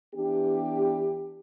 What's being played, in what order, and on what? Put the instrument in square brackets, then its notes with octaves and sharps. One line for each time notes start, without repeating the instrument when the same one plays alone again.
[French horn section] E3 B3 D4 G4